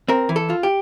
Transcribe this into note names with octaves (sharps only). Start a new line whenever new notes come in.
C4 A#4
E3
A4
F4
G4